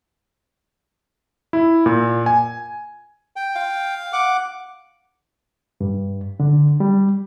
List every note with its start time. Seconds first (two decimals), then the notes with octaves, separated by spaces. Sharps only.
1.53 E4
1.86 A#2
2.26 G#5
3.36 G5
3.56 F5
4.13 F#5 D6
5.81 G2
6.40 D3
6.80 G3